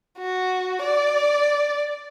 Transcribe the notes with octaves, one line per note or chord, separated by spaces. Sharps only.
F#4
D5